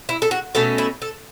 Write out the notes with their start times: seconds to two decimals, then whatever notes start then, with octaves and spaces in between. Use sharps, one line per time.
0.09 E4
0.22 A4
0.31 F#4
0.55 B2 A3 C#4 A4
0.78 E4
1.02 A4